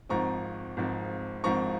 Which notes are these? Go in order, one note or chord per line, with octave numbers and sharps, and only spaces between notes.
G#1 G#2 F3 C4 A#5 C#6
G#1 G#2 F3 C4
G#1 G#2 F3 C4 A#5 C#6